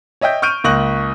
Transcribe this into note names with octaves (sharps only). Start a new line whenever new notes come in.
C#5 D#5 E5 G5 G6
C#6 F6 G6 D7 D#7
C#2 A#3 C#6 F#6 A#6 F#7